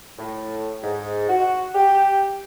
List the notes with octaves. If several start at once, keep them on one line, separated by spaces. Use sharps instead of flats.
A2
G#2
F#4
G4